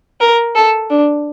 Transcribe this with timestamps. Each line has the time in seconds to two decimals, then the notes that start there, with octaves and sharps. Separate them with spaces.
0.21 A#4
0.55 A4
0.90 D4